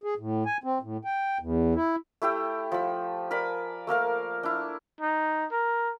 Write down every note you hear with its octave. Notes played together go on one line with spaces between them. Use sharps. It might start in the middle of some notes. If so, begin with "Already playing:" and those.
G#4
A2
G#5
C4
A2
G5
E2
E4
A3 E4 G4 G5
F3 B5
A#4 D5 G#5 B5
A3 A#3 A#4 F5
D4 E4
D#4
A#4